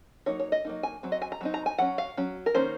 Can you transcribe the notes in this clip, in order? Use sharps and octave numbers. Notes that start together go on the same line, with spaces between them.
F#3 A#3 D#4 C#5
C#5
D#5
F#3 A#3 D#4
G#5
F#3 C4
D#5
G#5
A#5
F#3 C4 D#4
A#5
G#5
F#3 C#4 F#5
F5
F#3 C#4
A#4
D#3 A#3 C#4 C5